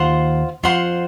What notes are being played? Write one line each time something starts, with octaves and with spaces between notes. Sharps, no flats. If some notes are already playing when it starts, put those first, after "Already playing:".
Already playing: D#2 D#3 F4 C5 F#5 C6
F2 F3 F4 C5 F#5 C6